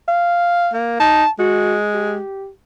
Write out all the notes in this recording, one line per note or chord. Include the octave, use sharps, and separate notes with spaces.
F5
A#3
D#4 A5
G#3 F#4
G4